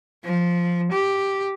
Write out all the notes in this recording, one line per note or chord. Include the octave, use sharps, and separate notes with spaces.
F3
G4